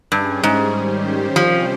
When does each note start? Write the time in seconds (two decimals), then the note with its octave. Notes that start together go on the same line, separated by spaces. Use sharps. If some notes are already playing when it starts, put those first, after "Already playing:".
0.11 G2 G3 C#4 G#4
0.43 G#2
0.74 D#3 G3 C#4 G4 C5
1.36 C3 F3 G3 C#4 G4 C5